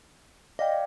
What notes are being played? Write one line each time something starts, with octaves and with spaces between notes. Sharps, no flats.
D5 D#5 F5 G5